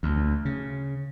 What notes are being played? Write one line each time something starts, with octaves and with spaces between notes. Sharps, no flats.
D2
C#3